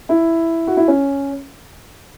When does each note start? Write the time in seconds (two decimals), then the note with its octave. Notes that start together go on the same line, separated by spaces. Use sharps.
0.09 E4
0.67 F#4
0.77 E4
0.88 C#4